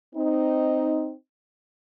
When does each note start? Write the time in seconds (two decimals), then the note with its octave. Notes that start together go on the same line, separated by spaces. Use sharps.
0.15 C4 D#4